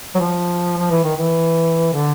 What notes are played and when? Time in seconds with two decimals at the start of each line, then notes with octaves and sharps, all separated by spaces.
0.15 F#3
0.19 F3
0.77 F3
0.90 E3
1.03 D#3
1.16 E3
1.93 D3